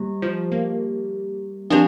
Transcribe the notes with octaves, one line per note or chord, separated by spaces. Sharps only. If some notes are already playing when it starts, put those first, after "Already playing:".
Already playing: G3 A#3 G4
F3
A#3
F3 C4 D4 G4 D5